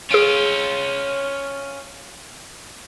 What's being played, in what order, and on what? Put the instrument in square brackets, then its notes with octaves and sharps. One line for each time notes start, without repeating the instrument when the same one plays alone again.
[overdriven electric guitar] C#4 F4 [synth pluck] G#4 D7